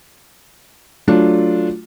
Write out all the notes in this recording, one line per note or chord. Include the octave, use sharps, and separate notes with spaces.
F#3 A3 D4 F4